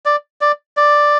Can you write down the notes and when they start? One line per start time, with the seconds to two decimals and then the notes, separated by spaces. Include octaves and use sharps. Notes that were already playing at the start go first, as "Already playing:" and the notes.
0.06 D5
0.41 D5
0.77 D5